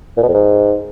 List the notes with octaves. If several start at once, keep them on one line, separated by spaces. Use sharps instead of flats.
A#2
B2
F2
G#2